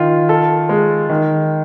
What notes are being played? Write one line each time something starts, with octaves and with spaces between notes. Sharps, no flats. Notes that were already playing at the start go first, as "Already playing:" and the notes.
Already playing: D#3 F4
A4
G#3
D#3